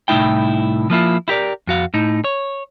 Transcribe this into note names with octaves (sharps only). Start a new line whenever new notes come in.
C2 A2 C#4 D#4 E4 G5
F3 A#3 E4 F4
E4 G4 A#4 D5
F2 F#4 F5
A2 D#4
C#5